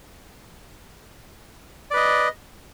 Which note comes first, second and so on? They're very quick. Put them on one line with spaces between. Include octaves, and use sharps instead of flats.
D5 B4 D#5